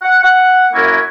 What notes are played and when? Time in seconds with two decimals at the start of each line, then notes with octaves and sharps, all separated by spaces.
0.02 F#5
0.22 F#5
0.73 F#2 A#3 C#4 E4 A#4